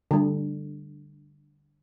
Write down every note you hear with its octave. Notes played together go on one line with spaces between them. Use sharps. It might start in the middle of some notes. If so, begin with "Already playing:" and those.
D3 G3